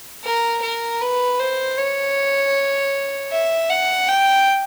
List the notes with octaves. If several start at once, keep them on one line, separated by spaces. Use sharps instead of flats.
A#4
A#4
B4
C5
C#5
E5
F#5
G5